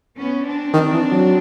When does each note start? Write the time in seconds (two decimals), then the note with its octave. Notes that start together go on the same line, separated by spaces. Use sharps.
0.18 B3 C#4
0.46 C4 D4
0.74 D#3
0.93 E3
1.11 F#3